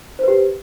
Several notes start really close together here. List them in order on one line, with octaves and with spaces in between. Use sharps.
C5 B4 G4